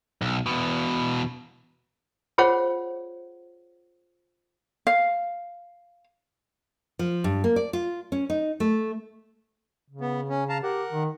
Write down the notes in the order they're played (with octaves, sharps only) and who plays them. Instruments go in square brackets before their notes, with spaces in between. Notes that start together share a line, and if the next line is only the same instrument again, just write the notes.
[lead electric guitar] B1
E2 B2
[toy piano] F4 G#4 C5 C#5 F5 F#5
[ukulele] F5
[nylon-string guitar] F3
G2
A#3
D5
F4
C#4
D#4
A3
[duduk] C#3
[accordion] B3
C#4
F5 A5 A#5
[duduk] G4 [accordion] A#4 F#5
[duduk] D#3